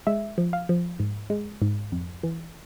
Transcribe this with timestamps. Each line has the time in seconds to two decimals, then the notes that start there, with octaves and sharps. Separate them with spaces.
0.07 G#3 E5
0.38 F3
0.53 F5
0.69 F3
1.00 G#2
1.30 G#3
1.62 G#2
1.92 F2
2.23 E3